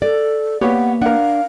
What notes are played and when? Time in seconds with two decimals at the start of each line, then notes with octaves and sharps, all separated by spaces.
0.02 A4 D5
0.61 A#3 B3 G4 C#5 F#5
1.02 D4 A#4 F5 F#5